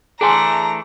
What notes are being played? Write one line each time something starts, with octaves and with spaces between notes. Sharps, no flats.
E3 A3 D4 G#4 G#5 A#5 C6